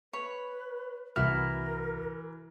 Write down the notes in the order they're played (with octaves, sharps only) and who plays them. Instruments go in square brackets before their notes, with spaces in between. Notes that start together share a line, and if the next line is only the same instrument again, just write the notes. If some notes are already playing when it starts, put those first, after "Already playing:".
[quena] B4 [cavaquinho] C#5 B5
[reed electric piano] C2 F#4 F6 [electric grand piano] E3 [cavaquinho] E4 [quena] A#4